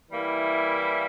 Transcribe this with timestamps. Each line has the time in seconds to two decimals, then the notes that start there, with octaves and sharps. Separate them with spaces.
0.11 E3 G3 A#3 E4